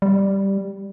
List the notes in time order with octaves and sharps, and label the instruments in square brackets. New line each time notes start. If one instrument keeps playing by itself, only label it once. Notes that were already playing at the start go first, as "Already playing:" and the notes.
[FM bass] G3